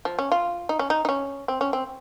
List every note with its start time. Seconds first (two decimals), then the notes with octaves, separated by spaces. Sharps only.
0.05 F3
0.19 C#4
0.32 F4
0.69 D#4
0.79 C#4
0.90 D#4
1.05 D#4
1.09 C#4
1.48 C4
1.61 C#4
1.73 C4